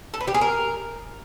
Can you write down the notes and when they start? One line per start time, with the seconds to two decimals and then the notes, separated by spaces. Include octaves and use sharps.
0.14 A4
0.21 B4
0.27 G4
0.34 G#4
0.41 A#4